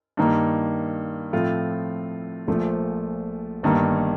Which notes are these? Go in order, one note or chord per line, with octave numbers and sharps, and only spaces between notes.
G2 D#3 A#3 D#4
A2 F3 C4 F4 A4
A#1 A#2 F3 A3
G1 G2 D#3 A#3 D#4